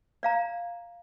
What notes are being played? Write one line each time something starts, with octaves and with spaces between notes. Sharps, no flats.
D5 F5 A#5